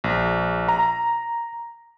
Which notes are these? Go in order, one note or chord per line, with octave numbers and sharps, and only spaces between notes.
A#1
A#5